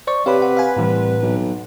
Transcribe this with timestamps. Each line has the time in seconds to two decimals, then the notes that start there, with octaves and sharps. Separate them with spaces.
0.07 C5 D5 C#6
0.26 C3 G4 B4 C#5 D5 F5 B5
0.42 F#5
0.57 F5 G#5
0.76 C2 A2 E3
1.22 B1